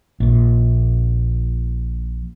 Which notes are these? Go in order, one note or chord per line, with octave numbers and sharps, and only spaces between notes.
A#1 A#2